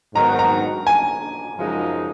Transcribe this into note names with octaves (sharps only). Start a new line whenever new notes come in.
G#2 D#3 F#3 B3 F#4 A#5
A#5
G#5
F#2 C#3 F3 G#3 D#4